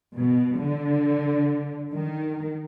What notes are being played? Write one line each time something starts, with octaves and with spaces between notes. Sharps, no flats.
B2
D3
D#3